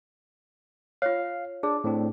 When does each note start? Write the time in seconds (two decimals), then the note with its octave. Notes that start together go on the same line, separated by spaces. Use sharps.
1.02 F4 C#5 F5
1.63 D4 G#4
1.84 A2 C4 D4